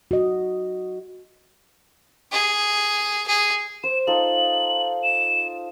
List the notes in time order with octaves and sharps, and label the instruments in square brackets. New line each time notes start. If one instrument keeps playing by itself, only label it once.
[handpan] F#4 D#5
[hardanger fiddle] G#4
G#4
[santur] C5 [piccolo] E7
[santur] D#4 F4 A4 [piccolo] F#7
[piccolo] E7